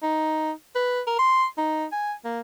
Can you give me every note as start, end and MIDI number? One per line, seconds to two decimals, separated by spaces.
0.03 0.52 63
0.75 1.01 71
1.07 1.17 70
1.19 1.45 84
1.58 1.85 63
1.92 2.13 80
2.25 2.40 58